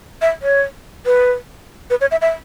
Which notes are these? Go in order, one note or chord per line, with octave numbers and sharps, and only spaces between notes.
E5
C#5
B4
B4
C#5
E5
E5